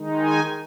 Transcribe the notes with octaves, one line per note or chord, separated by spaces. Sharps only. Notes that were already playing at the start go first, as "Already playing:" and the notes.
Already playing: D#3 G#3 D#4
G#5